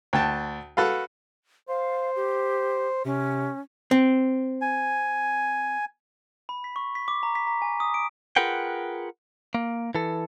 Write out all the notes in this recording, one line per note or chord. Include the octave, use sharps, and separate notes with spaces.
D2 G5 A5
F#4 A4 B4 F5
C5 F5
G4
C3 C#4
C4
G#5
B5
B6
C#6
B6
D6
A#5
B6
A#5
G#5
D#6
D7
F4 G#4 A#4 B4 F#5 G5
A#3
E3 A4